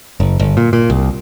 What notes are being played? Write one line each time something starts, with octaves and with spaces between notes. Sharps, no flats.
F#1
G1
A#2
A#2
C2